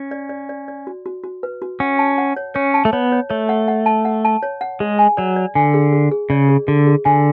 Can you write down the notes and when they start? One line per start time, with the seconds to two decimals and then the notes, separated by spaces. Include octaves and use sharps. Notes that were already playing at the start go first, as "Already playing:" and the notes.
Already playing: C#4
0.11 D5
0.29 D5
0.49 D5
0.68 D5
0.87 F#4
1.06 F#4
1.24 F#4
1.43 B4
1.62 F#4
1.80 C#4 F#5
1.99 A5
2.18 F#5
2.36 C#5
2.55 C#4 C#5
2.74 A5
2.85 A3
2.93 B3 C#5
3.12 C#5
3.30 A3 C#5
3.49 F#5
3.68 F#5
3.86 A5
4.05 F#5
4.25 A5
4.43 C#5
4.61 F#5
4.80 G#3 G#4
4.99 G#5
5.17 F#3 D5
5.36 D5
5.55 D3 G#5
5.74 G#4
5.93 G#4
6.11 G#4
6.30 C#3 D5
6.49 G#4
6.67 D3 G#4
6.87 G#4
7.05 D3 G#5